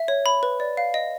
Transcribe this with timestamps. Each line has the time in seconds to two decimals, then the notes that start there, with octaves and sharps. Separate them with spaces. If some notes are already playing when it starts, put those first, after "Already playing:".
Already playing: E5
0.08 C#5
0.26 B5
0.43 B4
0.60 D5
0.77 F5
0.94 D#5